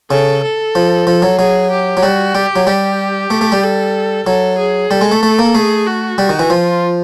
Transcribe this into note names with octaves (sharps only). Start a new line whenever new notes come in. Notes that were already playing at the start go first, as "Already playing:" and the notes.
C#3 A4
A4
F3
F3
F#3
F#3 G#4
G4
F#3
G3 F#4
G3 G4
F#3
G3 G4
A3
A3
G3
A4
F#3 A4
G#4
G3 A4
G#3
A3
A3
A#3
A3 G#4
F#4
G3
D#3
E3
F3 F4